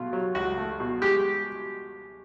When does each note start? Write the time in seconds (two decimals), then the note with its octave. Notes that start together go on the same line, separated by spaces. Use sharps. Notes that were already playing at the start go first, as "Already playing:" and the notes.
Already playing: B2 A3 F4
0.13 F#3
0.35 C#2 F#4
0.58 A3
0.80 B2
1.02 G#3 G4